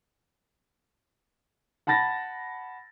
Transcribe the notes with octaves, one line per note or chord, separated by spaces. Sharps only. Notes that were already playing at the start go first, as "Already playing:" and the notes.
F#5 A5 B5 A6 A#6